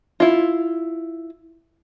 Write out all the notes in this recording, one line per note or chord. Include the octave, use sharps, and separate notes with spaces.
E4 F4